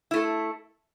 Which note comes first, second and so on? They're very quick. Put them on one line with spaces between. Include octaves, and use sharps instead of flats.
E4 A3 A4